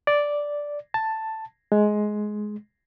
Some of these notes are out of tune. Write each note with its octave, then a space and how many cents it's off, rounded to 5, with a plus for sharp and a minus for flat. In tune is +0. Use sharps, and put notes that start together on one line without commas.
D5 -5
A5 +5
G#3 +15